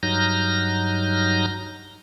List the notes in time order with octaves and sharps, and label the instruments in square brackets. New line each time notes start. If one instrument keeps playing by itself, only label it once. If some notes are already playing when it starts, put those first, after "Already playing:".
[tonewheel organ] G2 F#3 D#4 F6 G6 A#6